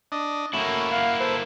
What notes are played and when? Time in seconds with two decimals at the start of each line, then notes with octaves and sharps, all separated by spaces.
0.12 D4 D#5
0.53 A3 A#3 C#4 E4 F#4
0.91 F5 F#5
1.20 A4 B4 C5